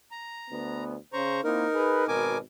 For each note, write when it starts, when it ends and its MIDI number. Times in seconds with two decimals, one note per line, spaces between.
0.11 0.84 82
0.50 0.95 38
0.50 0.95 59
1.13 1.41 49
1.13 1.41 72
1.13 1.41 82
1.13 1.41 85
1.44 1.67 58
1.44 1.67 60
1.44 2.07 63
1.44 1.67 64
1.44 2.07 70
1.74 2.04 68
1.74 2.04 71
2.08 2.38 32
2.08 2.38 47
2.08 2.38 70
2.08 2.38 80
2.08 2.38 86